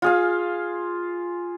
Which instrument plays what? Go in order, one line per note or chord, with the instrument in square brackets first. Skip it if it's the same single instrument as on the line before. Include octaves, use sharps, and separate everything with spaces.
[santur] F4 G#4 F5